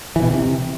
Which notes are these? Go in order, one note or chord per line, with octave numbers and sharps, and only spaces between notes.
E3
B2
D#3
C3